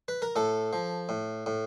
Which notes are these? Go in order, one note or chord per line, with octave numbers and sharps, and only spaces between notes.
B4
A#4
A2 A4
F3
A2
A2